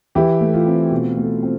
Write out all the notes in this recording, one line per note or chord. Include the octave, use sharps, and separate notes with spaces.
E3 E4 G4
A3
F4
C4
B2
A3
C4